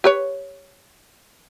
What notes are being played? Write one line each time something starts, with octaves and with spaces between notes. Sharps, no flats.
G4 B4 C#5